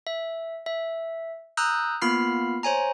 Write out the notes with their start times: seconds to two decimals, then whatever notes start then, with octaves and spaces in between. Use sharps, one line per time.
0.07 E5
0.66 E5
1.57 A#5 D#6 E6 F#6 G6
2.02 A#3 B3 F4 B5 F6 C7
2.63 C5 C#5 G#5 A#5